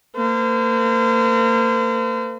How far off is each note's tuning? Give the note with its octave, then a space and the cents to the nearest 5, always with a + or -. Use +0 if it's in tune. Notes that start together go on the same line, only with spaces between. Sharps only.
A#3 -35 C5 -40